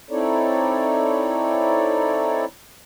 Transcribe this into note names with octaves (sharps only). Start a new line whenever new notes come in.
C4 D#4 E4 A4 C#5 D5